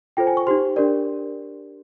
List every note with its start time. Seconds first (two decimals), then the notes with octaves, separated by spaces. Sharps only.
0.17 F4 A4 C5 G5
0.27 G#5
0.37 C#6
0.47 D#4 G4 C5 C6
0.76 D4 G4 A#4 D5